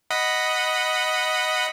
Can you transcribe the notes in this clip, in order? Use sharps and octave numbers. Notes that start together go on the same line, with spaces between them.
D#5 F#5 B5